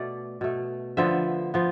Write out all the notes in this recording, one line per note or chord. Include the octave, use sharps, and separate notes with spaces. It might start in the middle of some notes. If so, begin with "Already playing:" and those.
Already playing: B2 A3 D5
B2 A3
D3 F3 B3 E5
F3 B3